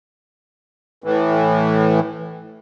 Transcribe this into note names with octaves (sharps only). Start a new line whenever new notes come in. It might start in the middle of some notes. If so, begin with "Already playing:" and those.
A2 E3